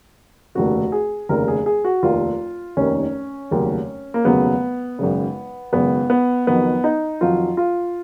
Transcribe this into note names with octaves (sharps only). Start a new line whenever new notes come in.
F1 D#2 C#3 F#4
G#4
F1 D#2 C#3 A#4
G#4
G#4
F#4
F1 D#2 D#3 F4
F1 D#2 D#3 C#4
F1 D#2 C#3 F#3
A#3
F1 D#2 C#3 F#3 B3
G#1 F#2 C#3
G#1 F#2 C#3 B3
B3
F2 D#3 F#3 B3
D#4
F2 D#3 F#3 F4
F4